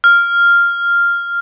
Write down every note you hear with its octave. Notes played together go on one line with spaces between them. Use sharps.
F6